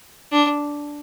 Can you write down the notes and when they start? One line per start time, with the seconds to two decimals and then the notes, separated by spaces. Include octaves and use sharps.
0.32 D4